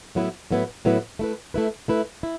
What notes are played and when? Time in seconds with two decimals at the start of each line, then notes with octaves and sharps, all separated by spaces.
0.15 A2 F#3 B3 E4 B4
0.51 A2 F#3 B3 E4 B4
0.85 A2 F#3 B3 E4 B4
1.19 A3 E4 B4
1.54 A3 E4 B4
1.88 A3 E4 B4
2.23 E4